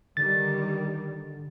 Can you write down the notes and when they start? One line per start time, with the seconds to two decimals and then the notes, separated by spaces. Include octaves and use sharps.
0.17 D3 D#3 G3 A6